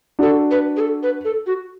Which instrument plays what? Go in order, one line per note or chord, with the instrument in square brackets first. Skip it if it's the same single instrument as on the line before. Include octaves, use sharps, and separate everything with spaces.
[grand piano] D4 F#4 [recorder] A4
[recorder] B4
G#4
A4
B4
A4
F#4